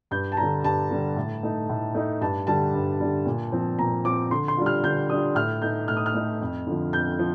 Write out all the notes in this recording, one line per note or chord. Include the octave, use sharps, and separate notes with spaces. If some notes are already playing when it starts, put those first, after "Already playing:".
G2 G6
A5
D3 G3 A#5
G2 A5
D3 G3
A2
A3 D#4
A2
A3 D#4
G2 A5
D3 G3 A5
G2
D3 G3
A#2
F3 C4
A#2 A#5
F3 C4 D6
D3 C6
C6
G3 D4 F4
F6
D3 G6
G3 D4 F4 D#6
A2 F6
A3 D#4 G6
A2 F6
D#6
F6
A3 D#4
F2
D3 F3
F2 G6
F3